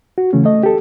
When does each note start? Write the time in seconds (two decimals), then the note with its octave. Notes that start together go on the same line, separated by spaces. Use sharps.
0.18 F#4
0.33 C#3 E3 A3 C#4
0.45 A3 D#5
0.63 G4 A4